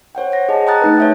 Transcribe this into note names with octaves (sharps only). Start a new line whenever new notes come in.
C5 C#5 F#5 G5
F#5 A#6
G#4 D#5 A5
G5 A5 A#5 D#6 F#6 A6
A3 D#4 B4
C#5 E5 G5